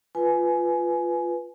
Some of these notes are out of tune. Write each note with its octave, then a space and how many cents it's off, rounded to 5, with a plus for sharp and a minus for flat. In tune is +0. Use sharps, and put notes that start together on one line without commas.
F4 +0 B4 +0 G#5 +20